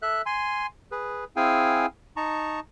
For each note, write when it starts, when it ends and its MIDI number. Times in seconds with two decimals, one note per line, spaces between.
0.02 0.22 69
0.02 0.22 76
0.02 0.22 90
0.26 0.66 80
0.26 0.66 84
0.92 1.24 68
0.92 1.24 71
1.36 1.86 60
1.36 1.86 64
1.36 1.86 68
1.36 1.86 77
1.36 1.86 79
1.36 1.86 80
2.16 2.60 63
2.16 2.60 81
2.16 2.60 82
2.16 2.60 85